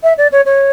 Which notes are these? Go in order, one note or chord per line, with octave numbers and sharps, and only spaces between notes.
E5
D5
C#5
C#5